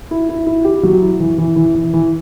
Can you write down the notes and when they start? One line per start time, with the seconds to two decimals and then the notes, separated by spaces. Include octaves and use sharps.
0.11 E4
0.29 E4
0.47 E4
0.65 G4
0.83 F#3
1.02 E4
1.20 E3
1.38 E3
1.56 E3
1.75 E3
1.94 E3